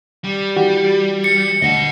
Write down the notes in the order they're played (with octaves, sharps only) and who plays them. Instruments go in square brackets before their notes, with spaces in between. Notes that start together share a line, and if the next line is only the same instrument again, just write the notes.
[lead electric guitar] G3
[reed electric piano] E3 F#4 G4
[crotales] C#7
[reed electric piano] D2 [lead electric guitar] D#5 F#5